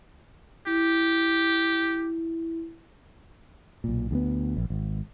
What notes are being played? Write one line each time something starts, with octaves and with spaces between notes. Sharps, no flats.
E4 G4
B1 A#2
D2 G3 B3
A#1
G#1